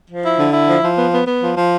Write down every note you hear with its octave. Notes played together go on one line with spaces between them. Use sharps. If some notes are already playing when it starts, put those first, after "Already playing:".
F3
E4
D3
E4
F3
F3
B3
B3
B3
F3
F3